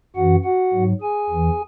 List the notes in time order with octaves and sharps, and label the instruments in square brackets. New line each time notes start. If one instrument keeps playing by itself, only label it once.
[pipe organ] F#2 E3 F#4 F#5
F#4 F#5
G#2 F#3
G#4 G#5
E2 E3